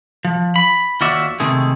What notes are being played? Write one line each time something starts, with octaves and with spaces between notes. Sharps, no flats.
F3
B5
D#2 F4 F#4 D5 E5
C3 D#3 G#3 A3 G#4